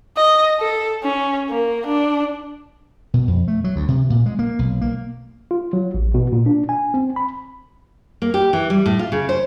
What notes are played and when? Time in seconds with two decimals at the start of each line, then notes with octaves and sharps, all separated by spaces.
0.17 D#5
0.60 A4
1.03 C#4
1.49 A#3
1.87 D4
3.14 B2
3.28 F2
3.48 A3
3.64 F#3
3.76 D2
3.88 C3
4.10 A#2
4.26 G#3
4.39 A#3
4.59 B1
4.81 A#3
5.51 F4
5.73 F#3
5.94 A1
6.14 B2
6.33 A#2
6.46 D4
6.69 G#5
6.94 C4
7.16 B5
8.22 A#3
8.34 G4
8.53 E3
8.70 G3
8.86 A2
8.99 F4
9.12 C#3
9.29 C5